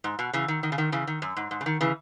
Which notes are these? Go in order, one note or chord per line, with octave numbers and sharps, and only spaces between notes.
G#2
B2
C#3 E3
D#3
D#3
C#3
D#3
C#3 E3
D#3
F#2
G#2
G#2
C#3
D#3
C#3 E3